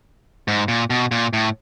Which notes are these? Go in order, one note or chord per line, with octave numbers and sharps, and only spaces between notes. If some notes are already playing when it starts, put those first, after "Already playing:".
G#2
A#2
B2
A#2
A2